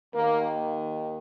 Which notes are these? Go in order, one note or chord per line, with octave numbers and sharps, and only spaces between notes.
D#2 D#3 A#3